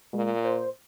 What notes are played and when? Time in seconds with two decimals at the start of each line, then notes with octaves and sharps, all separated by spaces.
0.14 A#2 G#3
0.44 C5